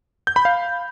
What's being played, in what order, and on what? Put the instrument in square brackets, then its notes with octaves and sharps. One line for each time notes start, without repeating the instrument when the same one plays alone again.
[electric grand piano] G6
B5
F5